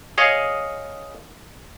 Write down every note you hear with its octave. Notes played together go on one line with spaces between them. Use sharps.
G#4 C#5 D#5 F5